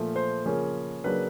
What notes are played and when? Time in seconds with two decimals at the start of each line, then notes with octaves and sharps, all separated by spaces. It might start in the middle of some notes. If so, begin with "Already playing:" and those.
Already playing: A#2 F3 A3
0.16 C5
0.46 C#3 F3 A#3 C#4
1.04 C#3 F#3 A#3 D4 B4